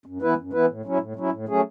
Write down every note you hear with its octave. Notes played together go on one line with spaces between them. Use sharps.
F#2
E3 B3 E4 B4
F#2
E3 B3 E4 B4
A2
F#3 C#4 E4
A2
F#3 C#4 E4
A2
F#3 A3 C#4 G#4